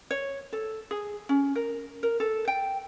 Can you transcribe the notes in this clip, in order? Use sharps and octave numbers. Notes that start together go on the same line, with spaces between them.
C#5
A4
G#4
C#4
A#4
A#4
A4
G5